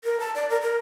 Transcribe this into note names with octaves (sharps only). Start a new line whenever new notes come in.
A#4
A5
D5
A#4
A#4